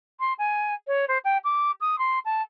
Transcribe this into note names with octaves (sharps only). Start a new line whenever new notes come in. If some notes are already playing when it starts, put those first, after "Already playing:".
C6
G#5
C#5
C5
G5
D6
D#6
C6
A5